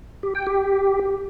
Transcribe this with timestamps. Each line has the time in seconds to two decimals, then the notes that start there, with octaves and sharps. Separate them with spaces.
0.23 G4
0.35 G5
0.47 G4